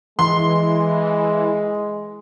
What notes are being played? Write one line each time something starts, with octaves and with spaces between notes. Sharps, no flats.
E3 G#3 C6